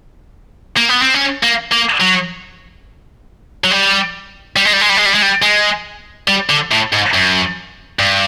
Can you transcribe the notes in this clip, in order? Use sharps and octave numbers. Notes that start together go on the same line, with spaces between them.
A#3
B3
C4
C#4
A#3
A#3
F#3
F#3
G3
G3
G#3
G3
G#3
G3
G#3
G3
G#3
G3
G#3
G3
D3
A2
G#2
F#2
G2